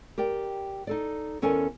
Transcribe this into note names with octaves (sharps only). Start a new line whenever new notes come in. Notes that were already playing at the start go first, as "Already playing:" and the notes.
G4 A#4 D5 G5
D#4 A4 D5
E2 C#4 A4 A#4 D5 G#5